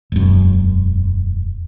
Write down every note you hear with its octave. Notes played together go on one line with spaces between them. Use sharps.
E1 F#2